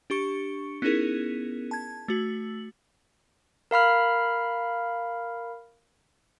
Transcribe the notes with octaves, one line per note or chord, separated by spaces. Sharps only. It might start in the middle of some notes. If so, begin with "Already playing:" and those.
D4 G4 C#6 C#7
B3 C#4 D#4 E4 G#4 A#4
A5 G#6
A3 F#4 F#7
A#4 F5 B5 F6